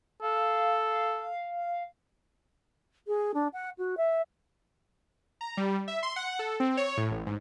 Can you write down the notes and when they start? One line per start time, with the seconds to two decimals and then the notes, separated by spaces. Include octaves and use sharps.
0.22 A4 F5
3.08 G#4
3.34 D4
3.53 F#5
3.78 F#4
3.97 E5
5.41 A#5
5.57 G3
5.88 E5
6.03 C6
6.16 F#5
6.39 A4
6.60 C4
6.77 C#5
6.97 A2
7.11 A1
7.26 G#2